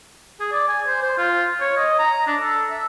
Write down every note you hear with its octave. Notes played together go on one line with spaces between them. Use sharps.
G#4
D5
G#5
C5
C5
F4
C#5
D#5
A#5
D4
A4
E5